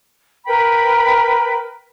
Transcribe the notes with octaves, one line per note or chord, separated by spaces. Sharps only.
A#4 B4 G5 B5